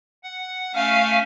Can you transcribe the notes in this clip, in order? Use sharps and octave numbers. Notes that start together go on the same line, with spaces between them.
F#5
A3 C#4 F5 G#5